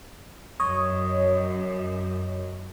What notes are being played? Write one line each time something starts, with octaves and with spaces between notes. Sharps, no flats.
F#2 C#5 D#5